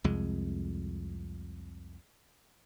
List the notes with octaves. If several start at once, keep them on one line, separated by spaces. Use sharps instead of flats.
C2 F2 G#3